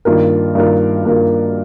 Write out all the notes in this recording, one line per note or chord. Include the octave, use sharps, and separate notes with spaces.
G2 D#3 A#3 F4 A#4
G2 D#3 A#3 F4 A#4
G2 D#3 A#3 F4 A#4